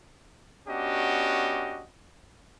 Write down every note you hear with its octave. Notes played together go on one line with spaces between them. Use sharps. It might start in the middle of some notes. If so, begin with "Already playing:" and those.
B3 C#4 D4 F#4 G4 D#5